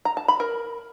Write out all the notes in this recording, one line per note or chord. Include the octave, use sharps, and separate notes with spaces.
A#5
A5
B5
A#4